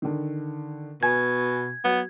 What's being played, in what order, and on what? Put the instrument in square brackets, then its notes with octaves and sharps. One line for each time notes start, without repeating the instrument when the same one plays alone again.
[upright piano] D3 D#3
[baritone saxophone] B2 [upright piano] G#5 [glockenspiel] G#6
[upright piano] F#3 [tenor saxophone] B3